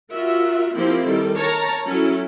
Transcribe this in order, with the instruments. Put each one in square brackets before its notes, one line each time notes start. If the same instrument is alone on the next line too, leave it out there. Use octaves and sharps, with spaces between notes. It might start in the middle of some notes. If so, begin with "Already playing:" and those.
[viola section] F4 F#4 A#4 E5
F3 A#3 C4 E4 G4
D#3 G3 A4
A#4 C#5 A5 A#5
F#3 C#4 E4 A4